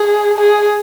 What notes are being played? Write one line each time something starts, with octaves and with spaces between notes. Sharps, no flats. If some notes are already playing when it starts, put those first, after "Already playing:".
Already playing: G#4
G#4